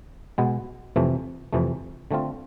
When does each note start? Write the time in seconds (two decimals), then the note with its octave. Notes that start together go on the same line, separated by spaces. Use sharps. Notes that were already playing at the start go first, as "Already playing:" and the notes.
0.38 B2 G#3 B3
0.96 F2 C3 E3 A3
1.53 F2 C3 E3 A3
2.11 D3 A3 C4 F4